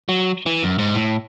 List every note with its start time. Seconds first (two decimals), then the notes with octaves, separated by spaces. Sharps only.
0.09 F#3
0.46 E3
0.63 F#2
0.78 G#2
0.95 A2